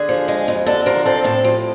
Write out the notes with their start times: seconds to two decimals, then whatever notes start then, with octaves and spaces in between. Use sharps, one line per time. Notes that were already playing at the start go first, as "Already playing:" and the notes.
Already playing: D3 G#4
0.09 F3
0.28 G#3
0.48 F2
0.66 D3 A4
0.86 F3 A#4
1.06 C4 A4
1.24 A2 A4
1.45 F3